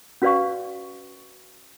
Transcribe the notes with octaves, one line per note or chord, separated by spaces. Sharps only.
C#4 F#4 B4 D5 F5 C#6